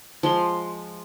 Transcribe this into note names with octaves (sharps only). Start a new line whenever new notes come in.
F3 G#3 C6